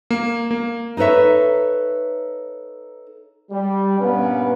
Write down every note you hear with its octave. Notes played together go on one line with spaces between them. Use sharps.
A#3
A#3
D#4 A4 B4 C#5 E5
G3
G2 A#2 B3 C#4 A#4 B4